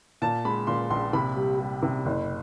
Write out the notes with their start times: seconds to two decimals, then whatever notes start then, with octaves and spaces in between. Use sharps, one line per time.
0.22 A#2 A5
0.45 G#3 B5
0.67 A#2 C6
0.90 A#1 C6
1.13 C3 B5
1.37 G3
1.59 G3
1.83 C3
2.06 F#1